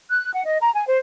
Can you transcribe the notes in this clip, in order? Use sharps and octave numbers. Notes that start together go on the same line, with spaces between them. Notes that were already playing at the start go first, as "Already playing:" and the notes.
F#6
F#5
D#5
A#5
G#5
C5